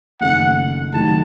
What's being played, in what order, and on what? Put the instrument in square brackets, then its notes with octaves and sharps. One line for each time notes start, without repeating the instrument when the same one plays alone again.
[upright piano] F#1 F2 D#3 A3 C#4 [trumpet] F#5
[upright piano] F2 C3 D#3 F#3 A3 [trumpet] A5